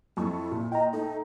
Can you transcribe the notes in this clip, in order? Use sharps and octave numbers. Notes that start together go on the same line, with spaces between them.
F2 E4 A4 C#6
A#2
D#5 G5 A#5
A3 D#4 A4